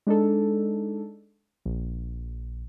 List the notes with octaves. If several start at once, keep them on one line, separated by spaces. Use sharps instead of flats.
G#3 D4 D#4 A4
A#1